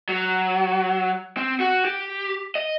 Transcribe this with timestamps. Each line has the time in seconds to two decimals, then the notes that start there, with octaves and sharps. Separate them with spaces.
0.09 F#3
1.37 C4
1.60 F#4
1.85 G4
2.55 D#5